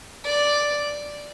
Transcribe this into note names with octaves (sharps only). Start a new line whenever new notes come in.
D5